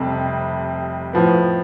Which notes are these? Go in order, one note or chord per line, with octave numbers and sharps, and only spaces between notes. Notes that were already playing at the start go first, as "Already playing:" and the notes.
Already playing: F1 F2 C3 G3
A2 F3 B3